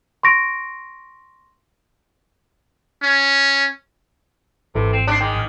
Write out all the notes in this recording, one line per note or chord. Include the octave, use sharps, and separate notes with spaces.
C6 C#6 A#6 D7
C#4
G#1 C3 E3 E4 A4
C4
C3 D4 F#6 C7
D#3 G#3 G5
A1 F6